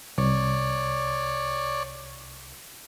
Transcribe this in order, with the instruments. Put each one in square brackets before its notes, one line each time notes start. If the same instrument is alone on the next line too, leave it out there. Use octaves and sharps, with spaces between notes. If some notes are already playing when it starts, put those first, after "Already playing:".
[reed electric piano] C2 [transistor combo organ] C#5 D5